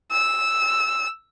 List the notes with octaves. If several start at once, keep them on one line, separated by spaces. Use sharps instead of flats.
E6